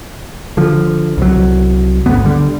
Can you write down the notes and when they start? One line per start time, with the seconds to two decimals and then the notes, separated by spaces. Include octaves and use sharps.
0.57 D3 F3
1.18 C2 F#3
2.06 G#1 D2 B3
2.25 D3 G3